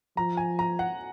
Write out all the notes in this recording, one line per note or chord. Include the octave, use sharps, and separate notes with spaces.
F3 A#5
G#5
A#5
F#5